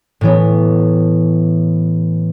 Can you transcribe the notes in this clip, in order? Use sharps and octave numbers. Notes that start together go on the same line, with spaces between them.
A2 E3 B3